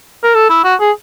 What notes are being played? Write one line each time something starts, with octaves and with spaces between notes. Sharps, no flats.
A#4
A4
E4
F#4
G#4